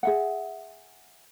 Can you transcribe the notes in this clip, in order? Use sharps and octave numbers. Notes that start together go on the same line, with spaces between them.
G#4 E5 F#5